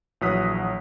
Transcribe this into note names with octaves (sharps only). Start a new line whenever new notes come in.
A#1 E3 F#3 D#6 F#6 B6